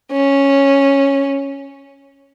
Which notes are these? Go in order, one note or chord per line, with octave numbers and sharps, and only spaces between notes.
C#4